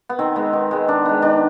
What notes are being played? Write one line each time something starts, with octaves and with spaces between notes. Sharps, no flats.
B3
D#3 C4
G#3 B3
D#3
G#3 B3
D#3 D4
G#3 B3
D#3 D4